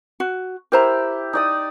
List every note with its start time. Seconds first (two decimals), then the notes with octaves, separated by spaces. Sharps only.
0.20 F#4
0.72 E4 G4 A#4 C5 A#5
1.33 D#4 D5 D#6